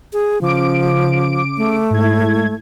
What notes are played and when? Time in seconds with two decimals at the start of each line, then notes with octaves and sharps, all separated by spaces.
0.13 G#4
0.41 C#3 F3 D6 D7
1.57 A3
1.90 G#2 E4 G#6